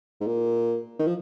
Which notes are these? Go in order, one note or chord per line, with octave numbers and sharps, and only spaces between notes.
G#2
A#2
D#3
F3